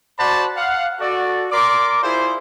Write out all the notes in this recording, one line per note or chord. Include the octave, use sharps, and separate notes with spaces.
F#4 C5 D5 F#5 A5 B5
F5 F#5
F#4 A4 D5
A#4 D5 C6 D6
E4 F4 G#4 C5